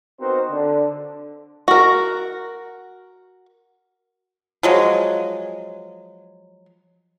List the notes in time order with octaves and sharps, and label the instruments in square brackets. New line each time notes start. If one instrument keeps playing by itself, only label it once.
[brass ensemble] B3 C4 D#4 F#4 A#4 C5
D3
[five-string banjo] F#4 A#4
[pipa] F3 F#3 G#3